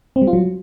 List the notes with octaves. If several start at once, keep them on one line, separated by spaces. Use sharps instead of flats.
C4
G3
F4
F#3